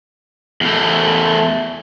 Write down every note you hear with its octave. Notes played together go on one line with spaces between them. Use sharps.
E2 A3